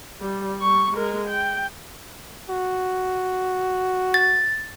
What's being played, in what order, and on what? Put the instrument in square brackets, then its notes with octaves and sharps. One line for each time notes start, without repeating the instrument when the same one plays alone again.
[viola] G3
G3 C#6
G#3 A#4
G5
[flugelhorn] F#4
[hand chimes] A6